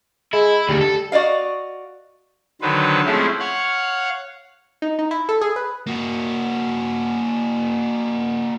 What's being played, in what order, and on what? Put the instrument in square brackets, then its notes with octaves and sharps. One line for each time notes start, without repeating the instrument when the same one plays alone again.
[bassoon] G#3 [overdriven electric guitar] E4
[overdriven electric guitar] D2 D#3 [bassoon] G3
[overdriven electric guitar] A4
[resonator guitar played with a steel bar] F#4 D5 D#5 F5
[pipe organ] D3 D#3 F#3 B4 C5
F3 G#3 A3 C4 C#4 E4
C#5 F5 F#5
[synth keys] D#4
D#4
E4
A4
G#4
B4
[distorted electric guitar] A#3 F#4